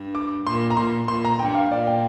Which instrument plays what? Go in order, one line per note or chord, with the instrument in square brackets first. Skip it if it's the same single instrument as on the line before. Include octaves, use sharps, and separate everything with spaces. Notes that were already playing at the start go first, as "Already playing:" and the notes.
Already playing: [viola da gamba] G2
[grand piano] D6
[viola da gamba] A#2 [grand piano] C6
[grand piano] A#5
[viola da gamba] A#2 [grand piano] C6
[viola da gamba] A#2 [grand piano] C6
[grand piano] A#5
[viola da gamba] G2 [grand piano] G5
[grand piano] F5
[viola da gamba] A#2 [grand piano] D5
[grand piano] G5